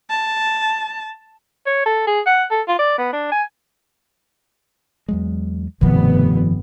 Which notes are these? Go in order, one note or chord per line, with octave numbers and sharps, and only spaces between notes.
A5
C#5
A4
G#4
F#5
A4
F4
D5
B3
D4
G#5
E2 F#3 G#3
F1 G2 B2 D#3 F3 B3